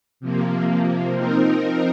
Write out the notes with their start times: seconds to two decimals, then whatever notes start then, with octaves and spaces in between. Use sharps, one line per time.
0.20 C3 F3 A#3
1.13 F3 C4 D#4 A#4